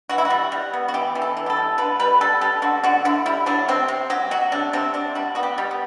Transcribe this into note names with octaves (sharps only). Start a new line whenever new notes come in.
E3 F#4
E4
F#4
G3
G3
B3
F#4
E3 G4
E3
A4
E3
G4
A4
G3
D3 B4
G3 B4
G3 A4
G3 A4
D3 F#4
D3 F#4
D3 E4
G3 E4
F#3 D4
C3 C4
C3
F#3 G4
F#3 F#4
C3 D4
C3 C4
C3 D4
G3 F#4
B3 F#4
G4
G3
B3